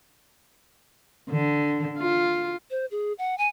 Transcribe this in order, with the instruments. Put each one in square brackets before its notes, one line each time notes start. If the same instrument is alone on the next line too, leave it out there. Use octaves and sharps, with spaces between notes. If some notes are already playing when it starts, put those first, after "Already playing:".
[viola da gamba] D3
F4
[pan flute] C5
G#4
F#5
G#5